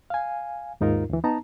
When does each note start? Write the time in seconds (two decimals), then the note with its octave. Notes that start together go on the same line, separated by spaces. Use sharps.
0.10 F5 G#5
0.81 D#2 G#2 D#4 F4 A#4
1.10 D2 E3
1.24 B3 D#4 A5 A#5